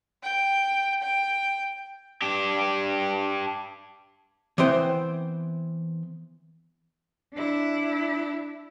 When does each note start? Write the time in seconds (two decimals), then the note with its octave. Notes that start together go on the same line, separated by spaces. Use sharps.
0.23 G5
1.03 G5
2.22 D4 G4
4.58 E3 B3 C4 C5 G5
7.33 D4 E4